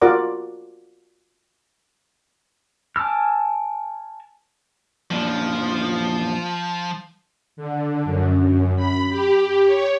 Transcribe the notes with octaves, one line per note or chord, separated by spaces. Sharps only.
F4 F#4 A#4 D5 F#5 D6
G#5 A5 D6 E6 F6
F#2 A#2 F3 D4
D3
F#2
F#2
B5
G4
C#5